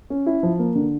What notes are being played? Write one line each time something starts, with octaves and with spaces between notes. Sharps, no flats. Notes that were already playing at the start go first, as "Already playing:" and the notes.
C#4
E4
F3
A#3
D3